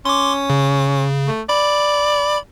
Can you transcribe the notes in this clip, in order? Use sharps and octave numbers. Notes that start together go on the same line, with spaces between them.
C#4 C6 D6
C#3
A3
D5 B5